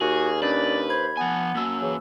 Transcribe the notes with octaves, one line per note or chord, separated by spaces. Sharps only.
D#2 F#4 G#4
C#4 D4 B4 D5
C5 B5 G#6
F3 B3 G#5
F#2 F#3 A#3 A5 E6
C#3 E3